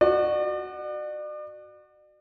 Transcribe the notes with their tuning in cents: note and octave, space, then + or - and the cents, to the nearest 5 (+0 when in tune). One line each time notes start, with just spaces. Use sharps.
F#4 +0 D5 +40